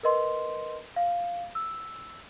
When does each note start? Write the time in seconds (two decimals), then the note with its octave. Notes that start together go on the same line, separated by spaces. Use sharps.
0.03 A#4 B4 D#5 C6
0.96 F5
1.55 E6